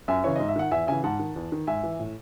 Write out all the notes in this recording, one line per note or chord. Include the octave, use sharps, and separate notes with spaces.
F#2 E5 G#5
C#3 E3 C#5
G#2 D#5
E5
D#3 F#5
E2 E5 G#5
C#3 E3 E5 G#5
G#2 F#5 A5
D#3
E2
D#3
G#2 E5 G#5
E3
A2